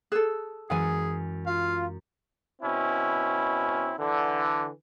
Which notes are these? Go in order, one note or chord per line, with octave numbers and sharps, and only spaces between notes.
G#4 A4 E6 F#6
F#2 E3 G#3 G#4 F#5 G#5
F4 F5
B2 C4 C#4 E4
D3 E3